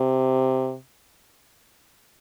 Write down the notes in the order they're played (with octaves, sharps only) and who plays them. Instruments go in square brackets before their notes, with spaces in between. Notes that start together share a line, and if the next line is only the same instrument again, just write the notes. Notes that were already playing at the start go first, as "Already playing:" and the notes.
Already playing: [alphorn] C3